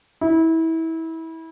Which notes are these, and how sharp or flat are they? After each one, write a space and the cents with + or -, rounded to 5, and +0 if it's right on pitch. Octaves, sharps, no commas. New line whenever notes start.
E4 -25